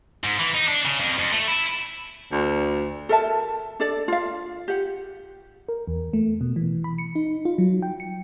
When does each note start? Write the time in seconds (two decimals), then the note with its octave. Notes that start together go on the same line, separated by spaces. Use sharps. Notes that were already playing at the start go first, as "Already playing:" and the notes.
0.24 G#2
0.39 E3
0.54 D#4
0.68 D4
0.85 C#3
1.00 F2
1.18 F2
1.32 A3
1.47 E4
2.32 D2
3.09 A4 A#4 E5 A5
3.80 D4 A4 D5
4.08 F4 F5
4.68 G4 F#5
5.69 A#4
5.87 E2
6.13 A3
6.41 B2
6.56 E3
6.84 B5
6.98 C#7
7.15 D#4
7.45 F4
7.58 F#3
7.82 G5
8.00 C#7